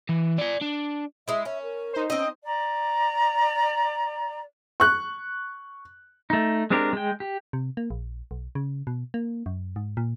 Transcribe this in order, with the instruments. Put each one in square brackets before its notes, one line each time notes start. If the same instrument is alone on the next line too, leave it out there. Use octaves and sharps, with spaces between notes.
[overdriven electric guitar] E3
D5 G#5
D4
[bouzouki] G#3 E4 [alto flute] E5
[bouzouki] C#4 [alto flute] E5
[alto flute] A#4
[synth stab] D#4 C5
[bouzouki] C4 D#5 [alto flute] C#4
[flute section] D5 A#5
[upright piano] C#6 F#6
[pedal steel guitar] A3 D#4
G#3 C4 D4 G4 A#4
G#3 G5
G4
[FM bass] C3
A#3
A#1
B1
C#3
B2
A#3
F#2
G#2
A#2